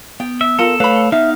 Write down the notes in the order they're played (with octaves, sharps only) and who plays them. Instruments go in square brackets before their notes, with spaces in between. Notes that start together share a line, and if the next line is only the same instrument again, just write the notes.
[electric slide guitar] B3 [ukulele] G5
[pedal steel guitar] E5
[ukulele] F4 A#4 [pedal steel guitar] A4
[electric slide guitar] A3 C#5 F5 [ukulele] B4 B5
[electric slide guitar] B3 D#4 [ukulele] E5 [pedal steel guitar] F5